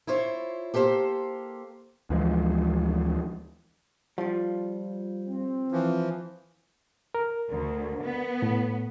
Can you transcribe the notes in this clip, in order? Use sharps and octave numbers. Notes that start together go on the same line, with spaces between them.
E4 F4 C5 C#5
A#3 G4 A4 C5 F5
D2 E3 F3 G#3
F3 G3 F4
C4
E3 F3
A#4
D2
B3
A2